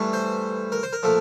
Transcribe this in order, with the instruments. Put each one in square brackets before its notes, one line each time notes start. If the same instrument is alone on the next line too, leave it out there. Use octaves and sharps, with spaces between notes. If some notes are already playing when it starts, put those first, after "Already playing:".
Already playing: [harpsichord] G2 E3 A3
C5
A#4
C5
A#4
A#2 F3 A3